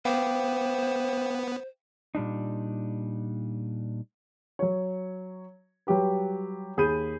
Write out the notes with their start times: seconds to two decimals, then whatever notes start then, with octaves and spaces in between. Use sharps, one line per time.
0.05 B3 C5 F5 G5 D6
2.15 A#2 G3 D4 D#4
4.59 F#3 C#5
5.87 F#3 G3 G4 B4
6.77 D#2 G#4 B5 G6 D#7